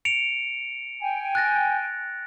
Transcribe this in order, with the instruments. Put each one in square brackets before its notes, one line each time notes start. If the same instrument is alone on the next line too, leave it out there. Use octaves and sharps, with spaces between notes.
[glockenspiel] C#7 D7 F7
[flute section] G5 G#5
[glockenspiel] F#6 A6 A#6